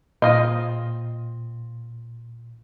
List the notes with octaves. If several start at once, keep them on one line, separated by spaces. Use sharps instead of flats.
A#2 C4 F4 D#5